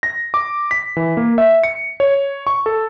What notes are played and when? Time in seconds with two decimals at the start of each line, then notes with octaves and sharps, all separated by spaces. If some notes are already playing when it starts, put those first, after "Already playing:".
0.03 A#6
0.34 D6
0.71 B6
0.97 E3
1.17 A#3
1.38 E5
1.63 C#7
2.00 C#5
2.47 C#6
2.66 A4